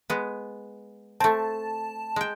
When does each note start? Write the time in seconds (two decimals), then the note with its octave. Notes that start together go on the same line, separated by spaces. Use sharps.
0.10 G#3 B3
1.20 A3 C4 A5
2.16 G#3 G5